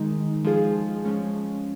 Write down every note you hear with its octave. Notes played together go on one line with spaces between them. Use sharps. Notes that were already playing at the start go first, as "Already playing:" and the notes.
Already playing: D#3 G#3 D#4
F3 G#3 F4 G#4
F3 G#3 C#4